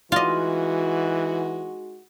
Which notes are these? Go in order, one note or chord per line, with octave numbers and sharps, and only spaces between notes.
E3 G#3 D#4 F4 F#4 D#5